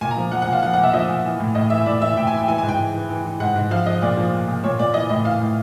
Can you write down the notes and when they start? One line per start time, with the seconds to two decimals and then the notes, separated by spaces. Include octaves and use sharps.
0.01 A#2 G#5
0.11 A#5
0.16 F3
0.32 F3 F#5
0.42 F#5
0.47 A#2
0.53 F5
0.63 F3 F#5
0.73 F#5
0.78 A#2
0.83 E5
0.93 F3 D#5
1.08 A#2
1.25 E3
1.40 A2
1.55 A2 D#5
1.70 E3 E5
1.86 A2 D5
2.01 E3 E5
2.17 A2 G5
2.27 G#5
2.32 E3 G5
2.48 E3 G#5
2.58 G#5
2.63 G#2
2.69 G5
2.79 E3
2.94 E3
3.09 E3
3.25 E3
3.40 G#2 F#5
3.56 G#2
3.71 F3 F5
3.86 F3 D#5
4.02 A#2 D5
4.17 F3
4.33 A#2
4.48 A#2
4.64 A#2 C#5
4.79 A#2 D5
4.94 E3 D#5
5.10 A2 D#5
5.25 E3 F5
5.41 A2